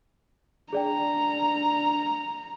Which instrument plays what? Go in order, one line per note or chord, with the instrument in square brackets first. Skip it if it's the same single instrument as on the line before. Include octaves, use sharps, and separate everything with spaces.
[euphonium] D4 [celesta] G#4 D5 G5 [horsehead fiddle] A#5